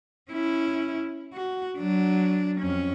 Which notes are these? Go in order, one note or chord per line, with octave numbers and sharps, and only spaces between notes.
C#4 E4
F#4
F#3 D4
F2 C#4